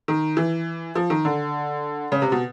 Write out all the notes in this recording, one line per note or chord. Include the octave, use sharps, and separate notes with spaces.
D#3
E3
F3
D#3
D3
C#3
C3
B2